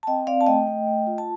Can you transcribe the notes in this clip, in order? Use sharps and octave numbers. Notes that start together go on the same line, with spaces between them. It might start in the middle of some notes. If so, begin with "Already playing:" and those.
A5
C4 D#5 G5
C4 D5 F5
A5
A3 D#5 G5
A3
A3
F4
A5